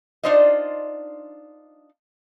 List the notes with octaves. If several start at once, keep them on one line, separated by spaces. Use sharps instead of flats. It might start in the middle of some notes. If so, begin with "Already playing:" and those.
D4 D#4 F4 C5 D5 D#5